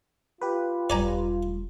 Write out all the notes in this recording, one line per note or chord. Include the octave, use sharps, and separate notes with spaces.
F4 G4 B4
E1 G3 D5 G#5 A#5